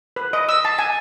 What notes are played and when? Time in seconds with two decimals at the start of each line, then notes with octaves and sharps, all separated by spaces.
0.16 B4
0.33 D#5
0.49 E6
0.65 A5
0.79 G#5